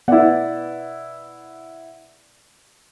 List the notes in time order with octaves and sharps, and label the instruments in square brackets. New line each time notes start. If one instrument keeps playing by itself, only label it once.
[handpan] B3 D5 [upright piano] E4 F#5